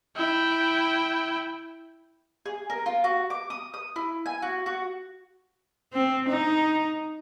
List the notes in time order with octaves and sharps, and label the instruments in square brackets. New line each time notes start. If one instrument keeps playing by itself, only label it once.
[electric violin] E4 G5
[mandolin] G#4
A#4
F4
F#4
D6
D#6
D#6
E4
G#5
F#4
F#4
[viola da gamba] C4
D#4